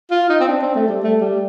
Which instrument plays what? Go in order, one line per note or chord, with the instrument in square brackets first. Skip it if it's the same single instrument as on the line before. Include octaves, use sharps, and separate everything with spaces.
[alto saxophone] F4
D#4
C4
D4
C4
A3
G3
A3
G3